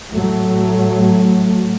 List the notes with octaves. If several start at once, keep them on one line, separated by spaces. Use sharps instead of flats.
A2 F#3 A3